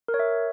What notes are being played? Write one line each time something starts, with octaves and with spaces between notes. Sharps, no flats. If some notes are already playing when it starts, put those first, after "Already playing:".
A#4
C#5
E5